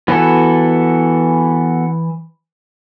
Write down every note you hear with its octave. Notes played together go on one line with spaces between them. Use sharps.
E3 B3 F#4 A4